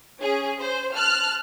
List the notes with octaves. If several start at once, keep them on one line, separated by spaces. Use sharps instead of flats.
C#4 G#4
C5
A5 F6 F#6